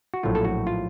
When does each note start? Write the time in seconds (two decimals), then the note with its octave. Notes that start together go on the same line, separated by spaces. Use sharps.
0.14 F#4
0.23 A#1 A2 F#3 A3 F4
0.35 A4
0.45 F#4
0.67 F4